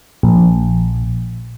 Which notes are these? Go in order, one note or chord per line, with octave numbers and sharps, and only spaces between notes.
A#1